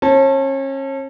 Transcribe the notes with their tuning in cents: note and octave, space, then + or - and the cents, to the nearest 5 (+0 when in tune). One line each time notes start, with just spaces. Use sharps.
C#4 -35 A5 +0